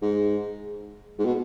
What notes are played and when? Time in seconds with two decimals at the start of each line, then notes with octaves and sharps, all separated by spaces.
0.02 G#2
1.19 G#2
1.25 B2